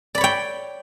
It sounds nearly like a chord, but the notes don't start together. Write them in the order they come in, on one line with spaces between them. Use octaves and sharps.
D5 B5 C#5 G5